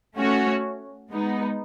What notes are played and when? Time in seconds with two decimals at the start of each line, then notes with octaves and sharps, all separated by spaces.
0.16 A3 C#4 F#4 C#5
1.10 G#3 B3 D#4